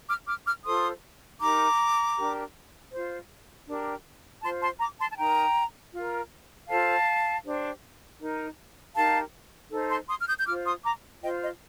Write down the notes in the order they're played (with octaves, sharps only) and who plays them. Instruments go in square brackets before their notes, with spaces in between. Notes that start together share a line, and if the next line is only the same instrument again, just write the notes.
[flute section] D6 F6
D6 F6
D6 F6
F4 A4 C5 C6 D#6
D#4 G4 A#4 A#5 D6
D4 G4 A#4
F4 C5
D4 G4 A#4
F4 C5 A5 C6
A5 C6
A#5 D6
A5 C6
A5
D#4 A#4 G5 A#5
F4 A#4
F4 A4 C5 F5 A5
D4 G4 C5
D#4 A#4
D#4 G4 A#4 F5 A5
D#4 A4 C5
A5 C6
C6 D#6
F6
D#6 G6
G6
F4 C5 D6 F6
C6 D#6
A#5 D6
F4 C5 D#5 G5
D#5